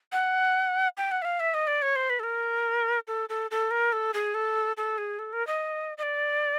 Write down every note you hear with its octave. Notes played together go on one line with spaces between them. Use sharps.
F#5
G5
F#5
E5
F5
E5
D#5
D5
C#5
C5
B4
A4
A#4
A4
A4
A4
A#4
A4
G#4
A4
A4
G#4
A4
A#4
D#5
D#5
D5